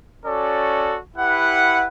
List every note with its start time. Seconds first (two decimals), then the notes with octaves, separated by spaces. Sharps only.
0.25 C#4 F#4 A4 D5
1.15 E4 G4 B4 F#5